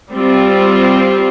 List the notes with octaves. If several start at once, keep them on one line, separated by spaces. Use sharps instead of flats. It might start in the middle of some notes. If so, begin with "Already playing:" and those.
G3 C4 F4